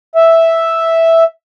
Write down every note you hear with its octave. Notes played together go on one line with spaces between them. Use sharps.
E5